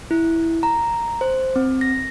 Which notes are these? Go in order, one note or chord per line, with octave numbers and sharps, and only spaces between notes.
E4
A#5
C5
C4
A#6